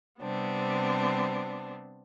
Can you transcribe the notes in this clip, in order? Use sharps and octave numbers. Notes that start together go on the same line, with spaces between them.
C3 G3 B3 C4 D4